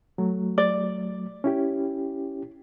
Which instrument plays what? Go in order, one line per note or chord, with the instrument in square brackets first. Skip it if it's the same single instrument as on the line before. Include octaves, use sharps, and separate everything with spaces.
[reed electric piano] F#3 A3
[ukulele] D5
[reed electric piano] C#4 E4 G4